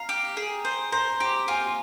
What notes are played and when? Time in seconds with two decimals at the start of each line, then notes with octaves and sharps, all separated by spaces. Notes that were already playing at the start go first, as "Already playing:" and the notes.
Already playing: F5 A#5
0.09 G4
0.37 G#4
0.65 C5
0.92 C5 A#5
1.20 G4 A#5
1.48 F4 G#5